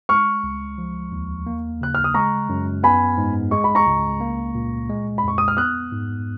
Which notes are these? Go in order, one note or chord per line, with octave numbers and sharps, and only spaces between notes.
G#3 C#6 F6
C#2
F3
D#2
A#3
C#3 F#6
F6
D#6
G#3 A#5 C#6
F#2
B3 G#5 B5
G#2
G#3 C#6
B5
A#5 C#6
C#2
A#3
A#2
G#3
F2 B5
C#6
D#6
F6
B3 D#6 F#6
G#2